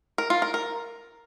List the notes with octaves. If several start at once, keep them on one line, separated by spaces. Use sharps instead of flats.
A#4
F4
A#4
A#4